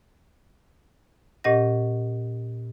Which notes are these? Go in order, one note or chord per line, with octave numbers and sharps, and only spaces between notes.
A#2 C#4 G4 D#5 F#5 A#6